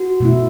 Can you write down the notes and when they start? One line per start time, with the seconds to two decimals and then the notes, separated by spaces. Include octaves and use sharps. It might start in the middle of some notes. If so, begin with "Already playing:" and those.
Already playing: F#4
0.20 B2 A3 E4